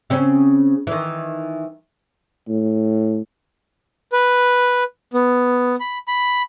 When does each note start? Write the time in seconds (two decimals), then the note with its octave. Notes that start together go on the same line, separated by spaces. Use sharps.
0.10 C#3 C4 C#4
0.87 D#3 E3
2.48 A2
4.12 B4
5.13 B3
5.80 B5
6.08 B5